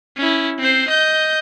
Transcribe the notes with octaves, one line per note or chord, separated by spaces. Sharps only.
C#4 E4
C4 C5
D#5 G6